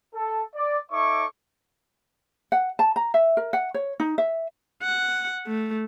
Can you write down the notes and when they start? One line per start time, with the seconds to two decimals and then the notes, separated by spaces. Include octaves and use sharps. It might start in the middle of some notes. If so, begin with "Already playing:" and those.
0.15 A4
0.55 D5
0.92 D#4 A4 C#5 E5 C#6 D6
2.52 F#5
2.79 A5
2.96 A#5
3.14 E5
3.37 A#4
3.53 F#5
3.74 C#5
4.00 D#4
4.18 E5
4.83 F#5
5.47 A3